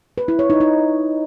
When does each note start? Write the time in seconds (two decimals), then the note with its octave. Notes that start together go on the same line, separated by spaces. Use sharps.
0.18 B4
0.28 E4
0.39 C#5
0.50 D#4
0.60 D#4